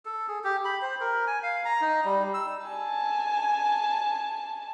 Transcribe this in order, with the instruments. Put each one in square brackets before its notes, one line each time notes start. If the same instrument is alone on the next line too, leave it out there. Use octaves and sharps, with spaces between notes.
[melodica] A4
G#4
G4
B5
C5
A#4
G#5
F5
A#5
D#4
G3
E6
[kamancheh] G#5 A5